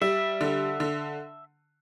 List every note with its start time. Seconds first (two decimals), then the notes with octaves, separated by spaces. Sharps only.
0.01 G3 E5
0.41 D3
0.80 D3